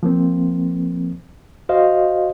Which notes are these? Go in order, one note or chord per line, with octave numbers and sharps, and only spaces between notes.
F3 A#3 C4
F#4 C5 D#5 F5